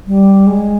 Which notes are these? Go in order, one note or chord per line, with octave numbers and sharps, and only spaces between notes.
G3
G#3